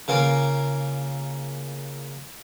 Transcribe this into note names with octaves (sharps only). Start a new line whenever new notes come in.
C#3 A#3 F4